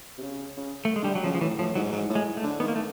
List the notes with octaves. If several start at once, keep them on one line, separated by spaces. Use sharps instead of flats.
C3
C#3
C#3
A3
G#3
D3 G3
F#3
C#3 F3
F3
A2 E3
A2 F3
G#2 F#3
G#2 F#3
A2
G#3
A3
D3
D#3 B3
A#3
A3